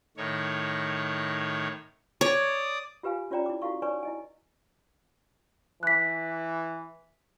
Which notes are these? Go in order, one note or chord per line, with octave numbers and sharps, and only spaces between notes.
A2 D#3 C#5
C#5 D5 D#6
F4 G4 B4 F5 G#5
C#4 F4 C#5 D5 G5 A#5
E4 D6
E4 F#4 A4 F5 C#6
D#4 B4 C#5 D5 G#5 C#6
E4 D#5 G#5
E3 F#6 B6